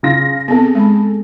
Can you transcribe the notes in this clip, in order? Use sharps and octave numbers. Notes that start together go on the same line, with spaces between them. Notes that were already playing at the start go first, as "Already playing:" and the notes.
C#3 F4 A#6
B3 C4 G#4 A4
G#3 B5